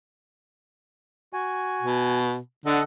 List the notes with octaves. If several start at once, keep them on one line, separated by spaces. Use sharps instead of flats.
F#4 G#5
B2
D3 A4 D#5 F#5